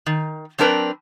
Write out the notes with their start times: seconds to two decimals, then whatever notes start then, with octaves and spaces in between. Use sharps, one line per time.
0.06 D#3
0.58 F#3 C4 D4 A#4 B4